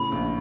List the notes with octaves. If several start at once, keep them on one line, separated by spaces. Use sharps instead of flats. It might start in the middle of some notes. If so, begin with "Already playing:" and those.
Already playing: A2 C#3 B5
A#1